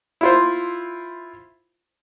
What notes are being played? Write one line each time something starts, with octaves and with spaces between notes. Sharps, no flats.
E4 F4 C5